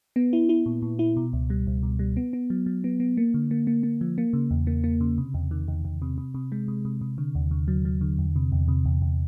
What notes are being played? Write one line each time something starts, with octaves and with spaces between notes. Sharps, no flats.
B3
E4
E4
A#2
A#2
E4
B2
C#2
G3
C#2
B2
G3
B3
B3
F#3
F#3
B3
B3
A#3
D3
A#3
A#3
A#3
F3
A#3
C#3
E2
A#3
A#3
C#3
C3
E2
D#3
E2
E2
C3
C3
C3
G#3
C3
C3
C3
D3
D#2
D3
F#3
F#3
D3
E2
C3
E2
C3
E2
E2